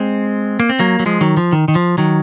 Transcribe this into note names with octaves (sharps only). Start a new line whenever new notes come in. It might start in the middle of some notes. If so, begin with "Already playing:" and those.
Already playing: G#3 C4
A#3
C4
F#3 A#3
F#3
F3 G#3
D#3 F#3
F3
D#3
D#3
F3
D#3 F#3